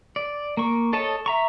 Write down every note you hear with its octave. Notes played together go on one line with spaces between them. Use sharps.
D5
A#3 C#6
A4 C#5 D#5 A5
E5 A#5 C#6